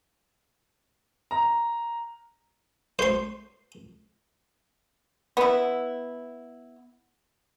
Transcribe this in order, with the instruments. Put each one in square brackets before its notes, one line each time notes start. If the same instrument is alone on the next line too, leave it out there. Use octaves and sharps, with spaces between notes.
[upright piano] A#5
[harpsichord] C5 C6
[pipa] B3 E4